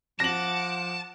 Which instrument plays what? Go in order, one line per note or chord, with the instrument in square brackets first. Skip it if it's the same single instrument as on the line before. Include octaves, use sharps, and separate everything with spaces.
[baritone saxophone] F3 [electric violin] F#5 D6 [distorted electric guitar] A5 [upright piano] A#6 F#7